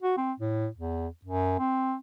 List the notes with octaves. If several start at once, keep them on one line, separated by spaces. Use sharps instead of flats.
F#4
C4
A2
E2
F#2
C4